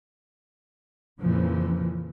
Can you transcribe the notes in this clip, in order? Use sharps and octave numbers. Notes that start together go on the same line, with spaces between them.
F2 A#2 C#3 E3 F3